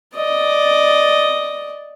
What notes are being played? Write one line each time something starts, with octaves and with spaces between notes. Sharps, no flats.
D5 D#5